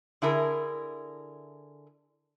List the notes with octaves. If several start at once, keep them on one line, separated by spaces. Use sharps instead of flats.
D3 E4 G#4 A#4